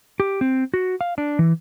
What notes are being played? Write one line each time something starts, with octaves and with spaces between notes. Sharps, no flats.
G4
C4
F#4
F5
D4
E3